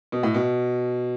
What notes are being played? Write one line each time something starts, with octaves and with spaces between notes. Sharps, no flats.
B2
A2
B2